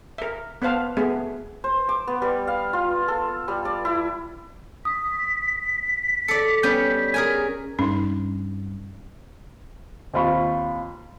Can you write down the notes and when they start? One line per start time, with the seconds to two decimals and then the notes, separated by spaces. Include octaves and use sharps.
0.18 A#4 E5
0.62 B3 B4 C5 F5 A5
0.97 A3 B3 G#4 E5
1.64 C5
1.89 D6
2.07 B3
2.22 G3
2.47 F5
2.73 F4
3.08 A4
3.48 G3
3.65 D5
3.85 E4
4.85 D#6 B6
6.28 A4 D5 C#7
6.63 G3 B3 C#4 G6
7.14 G#4 A#4 G#5 G#6
7.79 G2 C#4 D#4
10.14 D#2 C4 F4 B5 C#6